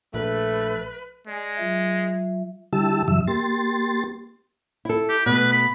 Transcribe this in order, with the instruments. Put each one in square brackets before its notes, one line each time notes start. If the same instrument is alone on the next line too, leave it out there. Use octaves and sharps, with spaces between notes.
[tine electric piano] A#1 [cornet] A3 [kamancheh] B4
[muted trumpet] G#3 [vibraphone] D5 G#5
[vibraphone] F#3 F4 E5
[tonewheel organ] D3 G3 E4 G4 A5 E6
F#2 C#3 E3 F#3 E5 E6
A#3 G4 C6 A6
[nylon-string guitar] E4 A4
[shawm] G4
[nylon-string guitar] B2 A3 [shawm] B4
[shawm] B5